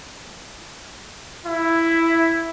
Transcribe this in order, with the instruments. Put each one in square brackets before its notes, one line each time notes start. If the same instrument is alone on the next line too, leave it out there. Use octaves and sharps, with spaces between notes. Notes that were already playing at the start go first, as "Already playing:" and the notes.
[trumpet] E4